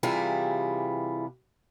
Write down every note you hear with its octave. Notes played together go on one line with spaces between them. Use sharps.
C3 E3 G3 E4 F4 G#4